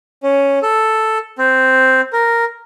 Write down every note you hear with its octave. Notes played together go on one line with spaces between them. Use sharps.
C#4
A4
C4
A#4